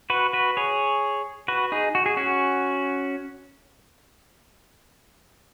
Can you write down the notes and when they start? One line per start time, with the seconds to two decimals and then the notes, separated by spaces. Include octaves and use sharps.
0.10 F#4 B4
0.33 F#4 B4
0.57 G#4 C#5
1.48 F#4 B4
1.72 D#4 G#4
1.95 F#4
2.06 G#4
2.17 C#4 F#4